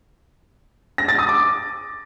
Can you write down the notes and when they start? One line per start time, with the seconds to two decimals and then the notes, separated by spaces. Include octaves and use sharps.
0.98 A#6
1.08 A6
1.19 D#6
1.29 D6